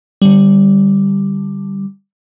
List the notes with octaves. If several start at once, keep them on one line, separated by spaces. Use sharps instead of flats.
D3 G3